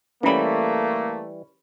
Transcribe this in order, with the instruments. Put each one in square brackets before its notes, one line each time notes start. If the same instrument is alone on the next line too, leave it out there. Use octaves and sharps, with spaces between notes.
[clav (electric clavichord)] E3 G3 [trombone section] A3 [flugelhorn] A#3 [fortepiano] C#4 B5